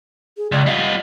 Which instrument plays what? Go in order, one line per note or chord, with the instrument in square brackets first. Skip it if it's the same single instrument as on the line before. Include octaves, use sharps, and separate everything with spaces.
[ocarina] G#4
[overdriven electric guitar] C#2 [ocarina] D5
[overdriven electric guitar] G3 F4 [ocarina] D#5